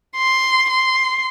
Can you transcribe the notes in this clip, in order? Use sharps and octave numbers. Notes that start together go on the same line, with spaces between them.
C6
C6